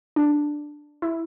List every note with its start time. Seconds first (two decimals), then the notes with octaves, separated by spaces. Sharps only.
0.16 D4
1.02 E4